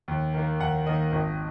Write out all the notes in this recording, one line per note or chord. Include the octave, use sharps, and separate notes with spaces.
D#2
D#3 A#3
D#2 F#5
D#3 A#3 D#5
G#1